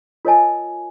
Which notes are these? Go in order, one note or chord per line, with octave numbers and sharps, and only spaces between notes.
F4 A#4 C#5 D#5 G#5 A5